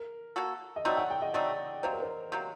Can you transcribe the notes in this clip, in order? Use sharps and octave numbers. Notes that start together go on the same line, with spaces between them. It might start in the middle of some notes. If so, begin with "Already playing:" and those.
Already playing: A#4
A#3 F#4 A4
D#5
F#3 A3 C4 D#4 D5
F#5
G5
D#5
F#3 A3 C4 D#4 D5
C3 F#3 A#3 C5
A#4
C5
C3 F#3 A#3